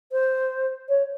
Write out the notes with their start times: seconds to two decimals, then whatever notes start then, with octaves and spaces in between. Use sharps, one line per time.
0.12 C5
0.89 C#5